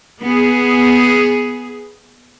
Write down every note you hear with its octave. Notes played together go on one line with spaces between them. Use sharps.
B3 G#4